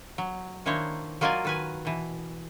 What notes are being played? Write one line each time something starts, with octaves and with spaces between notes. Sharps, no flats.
F#3
D#3 A#3 D4 E4 C5 C#5
F#3 A#3 F4 D5 D#5 G#5
D#3 B4 G#5
B2 E3